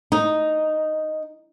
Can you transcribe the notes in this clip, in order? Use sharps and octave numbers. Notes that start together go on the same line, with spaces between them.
D#4